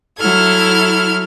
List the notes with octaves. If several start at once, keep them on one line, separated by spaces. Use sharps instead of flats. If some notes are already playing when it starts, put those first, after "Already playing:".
F#3 E4 A4 F6 G#6